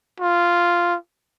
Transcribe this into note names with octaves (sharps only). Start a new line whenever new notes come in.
F4